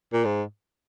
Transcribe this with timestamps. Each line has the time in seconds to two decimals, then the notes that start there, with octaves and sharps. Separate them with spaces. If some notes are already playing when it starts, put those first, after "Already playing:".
0.13 A#2
0.25 G#2